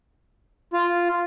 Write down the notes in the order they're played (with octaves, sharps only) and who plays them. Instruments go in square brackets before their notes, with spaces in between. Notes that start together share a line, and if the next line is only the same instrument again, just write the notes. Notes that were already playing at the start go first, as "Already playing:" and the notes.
[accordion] F4